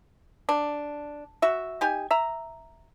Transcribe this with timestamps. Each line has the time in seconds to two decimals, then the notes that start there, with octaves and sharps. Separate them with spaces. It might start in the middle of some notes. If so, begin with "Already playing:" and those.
0.49 D4
1.42 F#4 E5
1.81 D#4 G4 G#5
2.11 E5 A#5